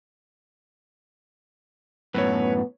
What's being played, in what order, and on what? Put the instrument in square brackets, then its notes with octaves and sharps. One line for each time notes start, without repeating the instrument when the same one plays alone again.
[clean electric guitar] F#2 A2 [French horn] B3 [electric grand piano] B4 C#5